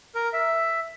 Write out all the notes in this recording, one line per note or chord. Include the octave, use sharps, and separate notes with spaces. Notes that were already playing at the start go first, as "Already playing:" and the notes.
A#4
E5